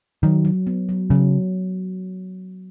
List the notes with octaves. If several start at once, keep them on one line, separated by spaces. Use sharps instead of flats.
D#3 F#3
F#3
B3
F#3
C#3 F#3